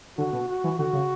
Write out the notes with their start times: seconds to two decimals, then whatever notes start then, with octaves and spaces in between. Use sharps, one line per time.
0.18 D3 F#4
0.33 B2
0.49 F#4
0.64 E3
0.79 D3 F#4
0.93 C#3